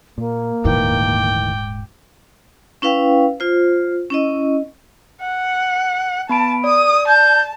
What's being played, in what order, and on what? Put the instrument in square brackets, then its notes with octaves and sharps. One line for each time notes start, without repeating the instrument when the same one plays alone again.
[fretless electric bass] A#2 [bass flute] A#3
[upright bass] D#1 G#2 [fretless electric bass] D2 D#3 E3 [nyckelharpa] G5 D6
[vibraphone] C#4 E4 B4 F5 G5
F4 C5
C#4 E4 D#5
[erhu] F#5
[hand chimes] B3 B5 D7 [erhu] A5
[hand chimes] D5 [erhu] D#6
[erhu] A5 [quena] G6